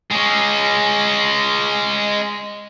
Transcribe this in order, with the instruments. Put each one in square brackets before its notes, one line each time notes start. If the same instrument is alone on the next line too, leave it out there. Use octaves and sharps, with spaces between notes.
[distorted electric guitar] G#3 C#4